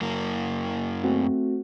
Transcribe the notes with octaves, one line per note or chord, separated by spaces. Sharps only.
F#2 A#3
A3 C4 F#4